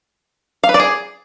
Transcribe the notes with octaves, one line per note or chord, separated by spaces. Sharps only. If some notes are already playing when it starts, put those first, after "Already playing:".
F5
B4
D5
G#4